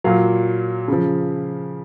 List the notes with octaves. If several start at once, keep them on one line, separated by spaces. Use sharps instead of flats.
A#2 F#3 F5
C#3 F3